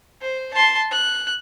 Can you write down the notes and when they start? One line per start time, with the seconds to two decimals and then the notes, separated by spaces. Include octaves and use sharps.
0.22 C5
0.54 A5 C6
0.91 F#6